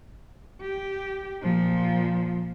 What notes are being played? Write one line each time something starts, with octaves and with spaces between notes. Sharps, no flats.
G4
A#2 F3